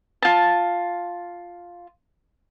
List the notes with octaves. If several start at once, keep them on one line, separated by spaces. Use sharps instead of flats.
F4 A5